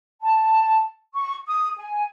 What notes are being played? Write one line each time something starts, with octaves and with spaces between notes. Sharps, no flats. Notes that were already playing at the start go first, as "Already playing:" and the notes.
A5
C#6
D#6
G#5